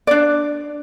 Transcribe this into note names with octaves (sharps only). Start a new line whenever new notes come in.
D4 D5